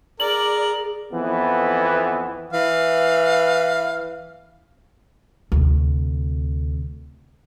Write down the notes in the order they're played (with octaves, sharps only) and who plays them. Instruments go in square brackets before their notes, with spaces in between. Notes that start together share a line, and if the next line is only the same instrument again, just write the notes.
[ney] G#4 [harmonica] A#4 [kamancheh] D5 [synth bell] F#7
[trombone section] F2 E3 B3
[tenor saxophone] E3 [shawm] F5
[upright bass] D2 C3